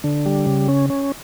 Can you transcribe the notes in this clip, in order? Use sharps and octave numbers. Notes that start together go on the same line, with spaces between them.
D3
G3
C#3
C#4
C#4